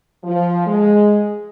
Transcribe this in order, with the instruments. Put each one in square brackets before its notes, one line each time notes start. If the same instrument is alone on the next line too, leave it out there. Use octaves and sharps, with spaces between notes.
[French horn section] F3
G#3